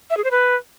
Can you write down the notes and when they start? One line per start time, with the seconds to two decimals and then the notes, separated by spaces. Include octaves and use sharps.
0.10 E5
0.17 G#4
0.24 C5
0.31 B4